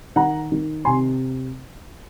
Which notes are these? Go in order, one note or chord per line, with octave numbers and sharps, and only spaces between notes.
D#3 F#5 A#5
D#3
C3 G#5 C6